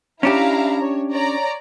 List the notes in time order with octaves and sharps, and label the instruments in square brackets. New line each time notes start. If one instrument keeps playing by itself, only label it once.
[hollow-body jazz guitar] C#4 D4 G4 [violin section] E4 F5 A#5
[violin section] C#5
C#5 D5 A#5